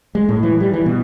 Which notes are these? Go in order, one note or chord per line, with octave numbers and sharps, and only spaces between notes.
G#3
A2
E3
G3
E3
B2